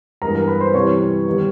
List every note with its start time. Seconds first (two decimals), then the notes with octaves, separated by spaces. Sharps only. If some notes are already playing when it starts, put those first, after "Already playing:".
0.22 G2 E3 G#3 B3 A#4 A#5
0.35 A#4 A#5
0.48 B4 B5
0.61 C5 C6
0.74 C3 E3 G3 C#5 C#6
1.28 D#3 G3 B3